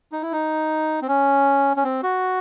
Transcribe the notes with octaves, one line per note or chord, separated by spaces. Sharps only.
D#4
E4
D#4
C4
C#4
C#4
C4
F#4